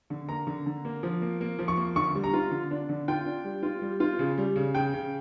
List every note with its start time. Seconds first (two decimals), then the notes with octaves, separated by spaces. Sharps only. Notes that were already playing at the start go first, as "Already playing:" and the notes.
0.10 D3
0.29 A#3 A#5
0.47 D3
0.66 D3
0.85 A#3
1.03 F3
1.22 A#3
1.41 A#3
1.59 F3
1.68 C#6
1.77 A#3
1.96 D3 C#6
2.15 G3
2.24 A#5
2.33 F4
2.51 D3
2.71 D4
2.89 D3
3.08 F4 G5
3.26 D4
3.45 G3
3.63 F4
3.82 G3
4.00 F4
4.19 C#3
4.38 G3
4.56 C#3
4.75 C#3 G5
4.94 C#3